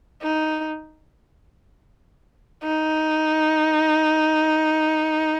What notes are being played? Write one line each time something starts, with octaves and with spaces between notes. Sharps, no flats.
D#4
D#4